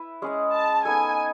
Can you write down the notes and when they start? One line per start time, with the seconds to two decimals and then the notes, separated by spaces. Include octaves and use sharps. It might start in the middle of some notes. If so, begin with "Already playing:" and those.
Already playing: E4 B4 E5
0.22 G#3 C#4 G#4 D#5
0.53 A5
0.85 B3 D#4 A4 G#5